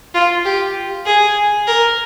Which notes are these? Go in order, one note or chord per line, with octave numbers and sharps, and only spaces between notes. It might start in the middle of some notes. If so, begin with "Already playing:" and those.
F4
G4
G#4
A#4